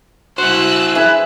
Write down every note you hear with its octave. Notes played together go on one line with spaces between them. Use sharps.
E4 F#4 C5 E6 F#6
G#4 B4 E5 G#5 B5